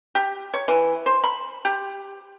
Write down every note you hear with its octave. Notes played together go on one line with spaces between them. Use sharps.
G4
C#5
E3
C5
B5
G4